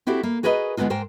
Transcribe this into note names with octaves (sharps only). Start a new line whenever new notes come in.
C4 E4 F#4 G4 A4
A#3
F#4 G#4 A#4 B4 C#5 D#5
D2 D3 G#3 B3 D#4 F4
G#2 A#4 C5 G5